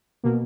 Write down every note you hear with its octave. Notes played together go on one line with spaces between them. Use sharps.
B2 A#3